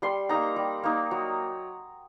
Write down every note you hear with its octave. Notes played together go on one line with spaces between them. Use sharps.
G3 C6
A#3 D#4 A#5
G3
A#3 D#4
F#3